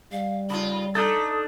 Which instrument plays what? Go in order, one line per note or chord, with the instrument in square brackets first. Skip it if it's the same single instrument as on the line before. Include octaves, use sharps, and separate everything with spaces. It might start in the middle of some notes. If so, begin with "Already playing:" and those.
[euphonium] G3 [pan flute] F5
[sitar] C#3 F4 [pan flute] B5
[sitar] A3 [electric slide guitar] D4 D#4 A4 [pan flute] D#6